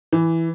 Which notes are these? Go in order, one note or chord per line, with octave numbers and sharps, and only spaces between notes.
E3